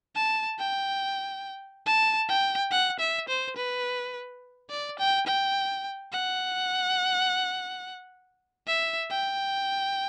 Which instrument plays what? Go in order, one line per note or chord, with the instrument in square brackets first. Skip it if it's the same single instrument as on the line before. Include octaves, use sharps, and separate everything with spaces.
[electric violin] A5
G5
A5
G5
F#5
E5
C5
B4
D5
G5
G5
F#5
E5
G5